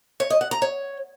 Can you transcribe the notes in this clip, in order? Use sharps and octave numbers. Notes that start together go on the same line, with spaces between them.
C#5
D#5
F#5
A#5
C#5